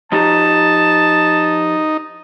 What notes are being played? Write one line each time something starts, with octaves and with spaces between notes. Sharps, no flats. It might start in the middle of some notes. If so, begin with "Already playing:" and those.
F3 D#4 G4 A5 A#5